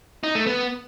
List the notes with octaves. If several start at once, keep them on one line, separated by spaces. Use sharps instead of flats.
D#4
A3
B3